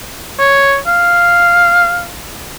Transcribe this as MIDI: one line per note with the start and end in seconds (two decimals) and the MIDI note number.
0.39 0.77 73
0.87 2.10 77